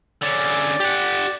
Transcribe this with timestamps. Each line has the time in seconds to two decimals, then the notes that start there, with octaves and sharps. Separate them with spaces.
0.22 D3 C#4 D5
0.80 G4 F#5